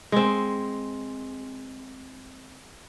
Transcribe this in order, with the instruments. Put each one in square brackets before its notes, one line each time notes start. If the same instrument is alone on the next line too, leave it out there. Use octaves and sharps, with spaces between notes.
[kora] G#3 C4